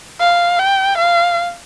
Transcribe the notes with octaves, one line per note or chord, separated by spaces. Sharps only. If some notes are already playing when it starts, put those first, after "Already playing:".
F5
G5
F5